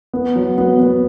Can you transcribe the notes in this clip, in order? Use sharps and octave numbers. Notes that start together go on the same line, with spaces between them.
B3
F#3
B3
B3